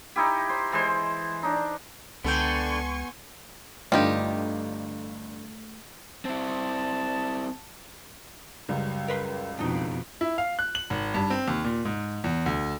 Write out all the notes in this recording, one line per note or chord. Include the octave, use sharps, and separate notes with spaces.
D#4 E4 G4
C5
E3 G#3 C5
D4 D#4
C#2 D3 B3 A4 G5 G#5 C6 C#6
G1 D3 G3 A3 D#4 F4 G4
C4 E4 A5
C#2 F#2 G3
A#4 B4 C6
F2 B2 D4 D#4
E4
F5
F#6
F#7
G#1
G2
C4
D#2
A#2
G#2
E2
D2